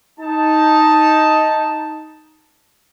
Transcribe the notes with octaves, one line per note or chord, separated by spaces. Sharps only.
D#4 A5